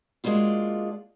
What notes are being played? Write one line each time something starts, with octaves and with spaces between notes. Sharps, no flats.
G#3 A#3 D4 F4 F#4